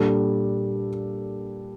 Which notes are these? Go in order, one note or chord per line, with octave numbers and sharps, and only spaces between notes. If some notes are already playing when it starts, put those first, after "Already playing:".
Already playing: A#2 G3 D4 A4